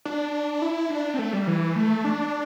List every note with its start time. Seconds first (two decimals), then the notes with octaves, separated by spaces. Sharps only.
0.05 D4
0.62 E4
0.90 D4
1.14 C4
1.19 A3
1.33 G3
1.47 E3
1.76 A3
2.04 D4